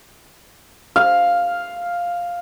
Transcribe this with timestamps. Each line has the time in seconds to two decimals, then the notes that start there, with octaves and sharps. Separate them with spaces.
0.96 F5